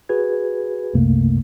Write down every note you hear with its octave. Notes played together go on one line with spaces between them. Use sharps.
F#4 G#4 B4 G#6
C2 F#2 C3 A3 A#3